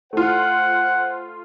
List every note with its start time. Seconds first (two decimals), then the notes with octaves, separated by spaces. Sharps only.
0.13 A3 F4 C5 F#5